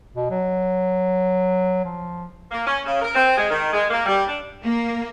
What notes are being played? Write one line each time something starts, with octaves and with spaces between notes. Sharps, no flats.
B2
F#3
F3
A#3
C#4
C#3
A#4
C4
G#3
D#3
G#3
A#3
G3
D4
A#3